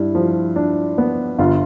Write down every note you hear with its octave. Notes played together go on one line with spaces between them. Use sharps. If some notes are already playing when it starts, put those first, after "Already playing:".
Already playing: G2 E4
F3
D4
B3
G1 F4